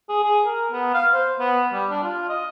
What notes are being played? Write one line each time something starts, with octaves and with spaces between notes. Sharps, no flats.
G#4
G#4
A#4
B3
F5
C5
B3
G3
D4
F4
D#5